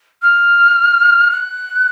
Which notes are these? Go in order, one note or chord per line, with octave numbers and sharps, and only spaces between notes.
F6
F#6